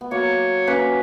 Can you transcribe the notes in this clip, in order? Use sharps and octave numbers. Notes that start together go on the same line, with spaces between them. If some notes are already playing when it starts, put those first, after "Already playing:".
B3
F#3 A#3 C#5
A#3 C#4 B4